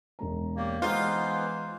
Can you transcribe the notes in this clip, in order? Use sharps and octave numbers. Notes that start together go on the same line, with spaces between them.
E1 G#3 A#5
A#3 G4 C#5 D5
E3 G#3 B3 D#4 F4 G#4 B4 C5